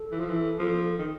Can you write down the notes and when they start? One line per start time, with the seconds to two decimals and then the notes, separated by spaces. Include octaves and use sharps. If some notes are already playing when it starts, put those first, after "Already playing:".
Already playing: A4
0.12 E3
0.20 F3
0.30 E3
0.59 F3
0.99 D#3